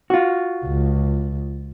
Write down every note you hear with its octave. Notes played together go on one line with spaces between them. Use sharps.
F4 F#4
C#2